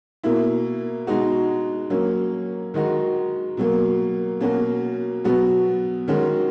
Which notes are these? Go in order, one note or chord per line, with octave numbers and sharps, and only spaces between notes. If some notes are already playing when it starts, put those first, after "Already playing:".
B2 A#3 E4
B2 G#3 D#4 F#4
F#3 A#3 C#4
D#3 G#3 D#4 F#4
B2 F#3 A#3
B2 A#3 C#4 F#4
B2 F#3 B3 F#4
D#3 G#3 C#4 F#4